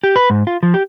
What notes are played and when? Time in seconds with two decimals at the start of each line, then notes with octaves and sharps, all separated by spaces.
0.04 G4
0.16 B4
0.30 G#2
0.47 F4
0.63 F3
0.74 G4